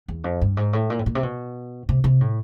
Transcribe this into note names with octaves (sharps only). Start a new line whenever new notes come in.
E2
F2
G2
G#2
A2
A#2
A2
A#2
C3
B2
C3
C3
A2